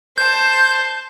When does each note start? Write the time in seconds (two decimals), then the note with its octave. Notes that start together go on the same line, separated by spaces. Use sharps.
0.18 C5 A5 G6